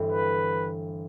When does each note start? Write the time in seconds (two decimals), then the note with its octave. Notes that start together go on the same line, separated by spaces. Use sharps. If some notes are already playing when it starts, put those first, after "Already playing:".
Already playing: G1 G2 E3 G3 C4
0.11 B4